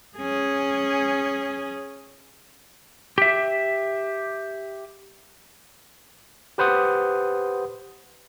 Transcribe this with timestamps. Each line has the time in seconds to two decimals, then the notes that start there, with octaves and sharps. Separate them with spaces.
0.17 C#4 G#4
3.18 G4 E5
6.58 G4 B4 C5 F#5 D#6